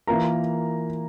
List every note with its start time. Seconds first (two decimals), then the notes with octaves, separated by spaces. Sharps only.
0.07 E3 A#3 F4 A#4 A#5